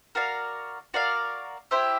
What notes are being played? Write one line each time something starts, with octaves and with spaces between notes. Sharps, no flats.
F#4 A#4 D5 F5
F#4 A#4 D5 F5
E4 G4 C5 E5